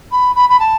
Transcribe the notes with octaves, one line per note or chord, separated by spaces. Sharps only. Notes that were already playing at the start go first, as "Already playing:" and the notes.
B5
B5
B5
A5